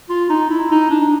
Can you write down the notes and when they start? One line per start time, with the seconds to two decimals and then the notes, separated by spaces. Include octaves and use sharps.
0.09 F4
0.29 D#4
0.50 E4
0.71 D#4
0.90 D4